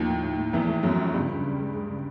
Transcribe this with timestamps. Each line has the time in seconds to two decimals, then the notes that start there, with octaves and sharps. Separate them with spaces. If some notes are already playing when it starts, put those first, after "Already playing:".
Already playing: D#2 D#3 F3
0.09 A2
0.23 A2
0.39 A2
0.53 E2 A2 E3
0.69 A3
0.83 F#2 F#3 A3
0.98 F3
1.14 G2 C#3 G3
1.28 C#3
1.43 C#3
1.59 G#3
1.74 G#3
1.89 C#3